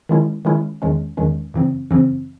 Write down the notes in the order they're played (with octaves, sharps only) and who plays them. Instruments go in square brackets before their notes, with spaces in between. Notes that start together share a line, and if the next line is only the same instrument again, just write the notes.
[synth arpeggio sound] D#3 G#3 C#4 E4
D#3 G#3 C#4 E4
E2 D#3 G#3 C#4
E2 D#3 G#3 C#4
F#2 C#3 E3 C4
F#2 C#3 E3 C4